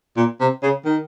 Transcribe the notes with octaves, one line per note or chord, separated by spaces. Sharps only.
A#2
C3
C#3
D#3